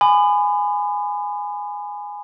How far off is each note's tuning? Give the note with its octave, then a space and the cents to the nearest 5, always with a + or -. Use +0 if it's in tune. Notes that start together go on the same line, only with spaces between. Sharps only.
G#5 -5 B5 +30 D#6 -45